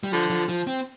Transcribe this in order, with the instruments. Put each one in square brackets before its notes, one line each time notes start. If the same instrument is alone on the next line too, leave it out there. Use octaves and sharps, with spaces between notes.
[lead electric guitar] G3
[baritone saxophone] D3 [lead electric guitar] F3
[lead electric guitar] F3
F3
C4